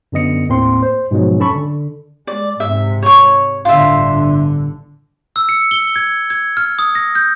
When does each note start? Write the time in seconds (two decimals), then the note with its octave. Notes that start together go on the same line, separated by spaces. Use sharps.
0.12 F#2 D3 B3 D#5 C#7
0.48 D#2 A2 A#3 C4 C6
0.83 C5
1.11 G#2 B2 F3 F#3 G#3
1.40 C#4 A4 A5 B5 C#6
1.54 D3
2.27 G#3 D5
2.60 G#2 C3 E5
3.03 C#5 C#6
3.65 G1 A2 D3 F4 E5
5.36 E6
5.49 C#7
5.71 G7
5.96 G#6
6.30 G#6
6.57 F6
6.79 D#6
6.95 A#6
7.15 G6